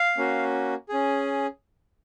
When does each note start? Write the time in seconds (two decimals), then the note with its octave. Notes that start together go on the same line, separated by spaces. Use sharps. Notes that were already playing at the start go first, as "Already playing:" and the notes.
Already playing: F5
0.17 A#3 C#4 F#4
0.89 C#4 G#4